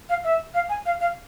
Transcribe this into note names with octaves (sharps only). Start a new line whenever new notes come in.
F5
E5
F5
G#5
F5
F5